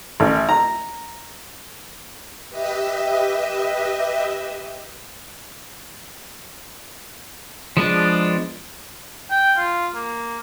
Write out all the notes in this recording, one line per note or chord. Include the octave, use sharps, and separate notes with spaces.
A1
A#5
G4 B4 D#5 E5
F3 G#3 B3 D4
G5
F4
A#3